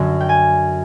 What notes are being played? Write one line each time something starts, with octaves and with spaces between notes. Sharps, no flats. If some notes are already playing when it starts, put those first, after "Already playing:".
Already playing: F#2 D3 F#3
G5
G#5